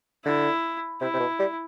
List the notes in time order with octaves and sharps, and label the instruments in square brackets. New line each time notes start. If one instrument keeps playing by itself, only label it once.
[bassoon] D3 [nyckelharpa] E4
[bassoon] C3 [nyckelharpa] E4
[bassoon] C3
B2
G3